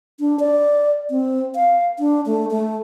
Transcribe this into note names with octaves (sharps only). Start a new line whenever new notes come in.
D4
D5
C4
F5
D4
A3
A3